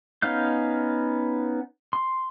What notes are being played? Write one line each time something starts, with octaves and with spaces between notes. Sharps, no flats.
B3 C#4 D#4 F5 G6
C6